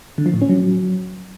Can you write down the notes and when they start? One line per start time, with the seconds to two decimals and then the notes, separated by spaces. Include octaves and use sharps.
0.18 D3
0.26 F3
0.34 A2
0.41 C#4
0.49 F#3